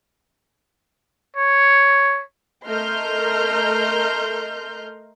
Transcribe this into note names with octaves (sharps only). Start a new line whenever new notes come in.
C#5
A3 A#4 D#5 C6 F6 G6